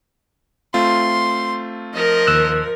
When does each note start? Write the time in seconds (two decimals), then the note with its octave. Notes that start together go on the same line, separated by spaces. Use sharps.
0.74 A3 C4 F4 C6
1.94 F3 A#4 D#5
2.27 D#2 E6 F#6